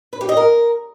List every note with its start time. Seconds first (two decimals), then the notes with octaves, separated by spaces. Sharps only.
0.13 B4
0.21 G4
0.29 D#5
0.37 A#4